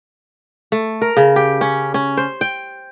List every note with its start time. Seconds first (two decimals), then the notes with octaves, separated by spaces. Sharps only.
0.72 A3
1.02 A#4
1.17 C#3
1.36 G4
1.61 C#4
1.94 C#4
2.17 C5
2.41 G5